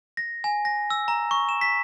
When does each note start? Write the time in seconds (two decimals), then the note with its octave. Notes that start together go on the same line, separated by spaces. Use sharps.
0.17 A#6
0.44 G#5
0.65 A#6
0.90 E6
1.08 A#5
1.31 C#6
1.49 E7
1.61 B6